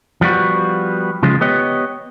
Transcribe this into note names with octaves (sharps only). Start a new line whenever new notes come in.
F3 G3 B3 F#4
C#3 F3 G#3
B3 G4 C#5 D#5